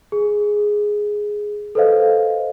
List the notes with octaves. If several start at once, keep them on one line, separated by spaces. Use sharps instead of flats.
G#4
A4 B4 C5 D#5 F5